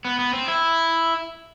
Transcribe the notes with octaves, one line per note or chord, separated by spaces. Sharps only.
B3
B3
C4
E4